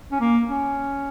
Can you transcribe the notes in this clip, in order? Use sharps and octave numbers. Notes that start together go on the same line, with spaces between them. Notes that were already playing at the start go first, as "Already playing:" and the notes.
C#4
A#3
C#4